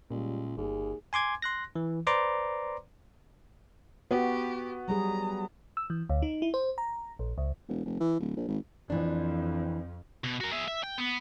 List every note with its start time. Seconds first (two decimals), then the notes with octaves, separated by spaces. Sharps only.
0.11 C#2 A#2 G3
0.57 G1 D#2 G#4
1.13 G#5 C6 D6 G#6
1.42 C6 F#6 A#6
1.76 E3
2.07 B4 C5 D5 A#5 C6 D6
4.11 B3 F#4 G4
4.88 F#3 G3 G#4 A#5
5.77 E6
5.90 E3
6.09 D2
6.22 D#4
6.42 E4
6.54 C5
6.78 A#5
7.19 A#1
7.38 C#2
7.68 E1
7.85 F1
8.00 E3
8.20 D1
8.37 A#1
8.48 G#1
8.90 F2 E3 D4
10.24 B2
10.41 F#4 A#4
10.52 G#4 E5
10.68 E5
10.84 G5
10.98 B3